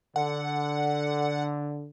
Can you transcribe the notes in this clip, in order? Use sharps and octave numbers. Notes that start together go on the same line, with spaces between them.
D3 F#5